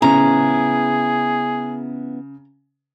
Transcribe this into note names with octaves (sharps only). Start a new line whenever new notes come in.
C#3 B3 C#4 E4 G#4 A#5